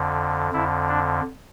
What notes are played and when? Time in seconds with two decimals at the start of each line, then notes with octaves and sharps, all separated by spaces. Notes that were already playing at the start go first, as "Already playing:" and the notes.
Already playing: F2 D3
0.53 F2 D3 E4
0.89 D4